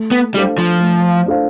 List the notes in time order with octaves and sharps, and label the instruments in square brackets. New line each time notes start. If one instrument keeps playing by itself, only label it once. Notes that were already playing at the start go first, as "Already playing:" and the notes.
Already playing: [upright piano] A3
[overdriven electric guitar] B3
[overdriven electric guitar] G3 [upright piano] D4 A4 C5 F5
[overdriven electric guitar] F3
[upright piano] A3
D4 A4 C5 F5